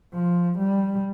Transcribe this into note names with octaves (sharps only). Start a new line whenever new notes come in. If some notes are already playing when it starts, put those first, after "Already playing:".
F3
G3